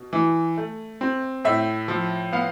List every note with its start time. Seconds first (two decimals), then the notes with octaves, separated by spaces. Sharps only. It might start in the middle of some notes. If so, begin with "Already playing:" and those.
Already playing: B2
0.13 E3
0.57 A3
1.01 C4
1.45 A2 E5
1.88 F3
2.33 B3 F5